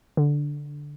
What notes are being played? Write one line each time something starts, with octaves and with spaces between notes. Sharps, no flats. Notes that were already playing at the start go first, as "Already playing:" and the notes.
D3